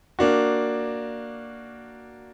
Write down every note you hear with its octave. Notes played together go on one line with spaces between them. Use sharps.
A#3 D4 F#4